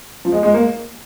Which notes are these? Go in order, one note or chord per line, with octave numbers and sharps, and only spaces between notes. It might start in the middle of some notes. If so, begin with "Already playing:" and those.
F3
G#3
G#3
A#3